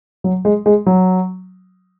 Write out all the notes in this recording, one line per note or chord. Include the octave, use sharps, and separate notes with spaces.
F#3
G#3
G#3
F#3